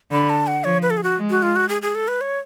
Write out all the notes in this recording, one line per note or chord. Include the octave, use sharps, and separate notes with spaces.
D3 B5
A5
F#5
F3 C#5
B4
A4
G#4
F#4
G#3
F#4
F4
F#4
G#4
G#4
A4
B4
C#5